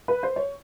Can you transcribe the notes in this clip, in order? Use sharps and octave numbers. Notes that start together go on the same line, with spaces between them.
B4
C5
C#5